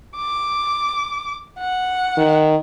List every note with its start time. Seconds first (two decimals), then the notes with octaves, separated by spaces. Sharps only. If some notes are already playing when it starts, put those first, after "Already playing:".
0.17 D6
1.59 F#5
2.17 D#3